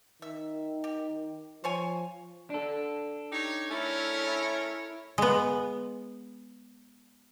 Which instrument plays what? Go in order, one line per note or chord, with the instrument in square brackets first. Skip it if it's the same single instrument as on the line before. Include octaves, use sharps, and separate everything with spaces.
[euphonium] D#3 [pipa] E5
[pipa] G4
[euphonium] F3 [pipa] C5 C#5 G#5
[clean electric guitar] D4 A4
[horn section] D#4 G4 C#5
[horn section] A3 C#4 A#4 [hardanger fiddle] E4 C#5
[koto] G#3 B3